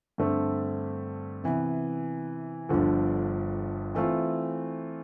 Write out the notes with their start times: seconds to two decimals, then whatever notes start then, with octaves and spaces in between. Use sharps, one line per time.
0.18 G2 D3 A3 C4
1.44 C3 E3 B3
2.69 G1 G2 D3 F3
3.95 E3 A3 C4 F4